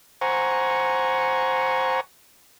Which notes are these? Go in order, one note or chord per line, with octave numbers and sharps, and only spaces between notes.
C5 F#5 G#5 A#5 C#6